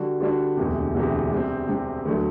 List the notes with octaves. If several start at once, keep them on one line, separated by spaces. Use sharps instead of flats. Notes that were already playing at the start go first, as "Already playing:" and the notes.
Already playing: D3 G3 D4 F#4
D3 G3 D4 F#4
E1 D2 C3
E1 D2 C3
C3 G3 C4
C3 G3 C4
D2 D3 F#3 A3